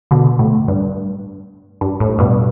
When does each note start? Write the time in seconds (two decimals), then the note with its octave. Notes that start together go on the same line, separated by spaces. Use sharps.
0.11 B2 D3
0.39 A2
0.68 G2
1.81 G2
2.00 A2
2.19 G2 B2